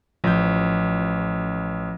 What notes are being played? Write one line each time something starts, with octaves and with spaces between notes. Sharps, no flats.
A1 F3 G6